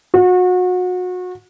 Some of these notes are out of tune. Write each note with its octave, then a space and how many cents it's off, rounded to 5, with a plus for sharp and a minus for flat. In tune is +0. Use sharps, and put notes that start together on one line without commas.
F#4 -30